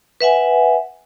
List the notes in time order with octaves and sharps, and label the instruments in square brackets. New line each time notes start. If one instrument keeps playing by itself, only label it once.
[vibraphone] B4 E5 F#5 G#5